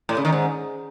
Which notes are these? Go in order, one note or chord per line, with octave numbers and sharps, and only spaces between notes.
A2
C#3
D#3
G#2